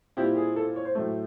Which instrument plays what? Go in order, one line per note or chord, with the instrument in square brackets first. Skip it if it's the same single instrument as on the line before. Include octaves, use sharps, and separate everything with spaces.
[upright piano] A#2 G3 C4 E4 G4
G#4
A4
C#5
C5
A2 F#3 A3